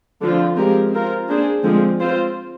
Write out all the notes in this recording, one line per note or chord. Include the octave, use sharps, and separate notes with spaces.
D3 F3 C4 F4
F3 G#3 C4 G4 A#4
C4 F4 A#4
A#3 D4 G#4 C5
D3 F3 G#3 C4
C4 F4 C5